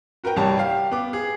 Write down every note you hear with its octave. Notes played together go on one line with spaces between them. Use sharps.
F#4 A#4 B4 G5
C2 G3 C#5 A5
G4 F5
B3 D6
G#4